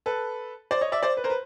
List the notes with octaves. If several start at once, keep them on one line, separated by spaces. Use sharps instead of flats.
A4 B4
C5 D5
C#5 D#5
D5 E5
C5 D5
B4
A#4 C5
B4